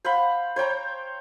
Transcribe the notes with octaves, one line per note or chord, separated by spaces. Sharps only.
C5 F5 F#5 B5
C5 C#5 G5 A#5